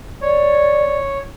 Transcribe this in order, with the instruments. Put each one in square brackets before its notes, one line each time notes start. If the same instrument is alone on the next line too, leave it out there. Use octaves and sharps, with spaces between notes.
[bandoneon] C#5 [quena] D5